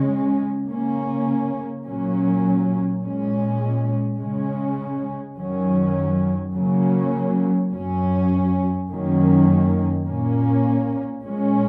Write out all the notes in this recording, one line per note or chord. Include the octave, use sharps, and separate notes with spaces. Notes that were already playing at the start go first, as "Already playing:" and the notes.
Already playing: C#3 G#3 C#4
C#3 A#3 C#4
A#2 F#3 A#3 C#4
A#2 G#3 C#4
C#3 G#3 C#4
F#2 D#3 F#3 C#4
C#3 F#3 A#3 C#4
F#2 F#3 C#4
F#2 D#3 F#3 A#3 C#4
A#2 A#3 C#4
A#2 G#3 C#4